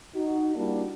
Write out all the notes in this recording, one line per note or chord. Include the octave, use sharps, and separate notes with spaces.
D#4 F#4
G3 A#3 D4 E4 F#4